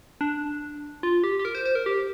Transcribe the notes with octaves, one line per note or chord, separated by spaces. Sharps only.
D4
F4
G4
G4
A#4
C5
C5
A#4
G4